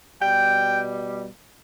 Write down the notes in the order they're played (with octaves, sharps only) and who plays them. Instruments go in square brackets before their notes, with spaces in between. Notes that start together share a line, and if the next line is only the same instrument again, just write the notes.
[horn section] B2 G3 G5